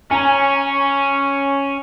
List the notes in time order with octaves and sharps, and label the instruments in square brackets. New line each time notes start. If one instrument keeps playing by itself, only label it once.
[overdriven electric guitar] C#4 [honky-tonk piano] G#5 A#5